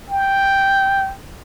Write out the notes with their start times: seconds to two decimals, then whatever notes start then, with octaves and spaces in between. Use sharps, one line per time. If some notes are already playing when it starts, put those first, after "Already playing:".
0.09 G5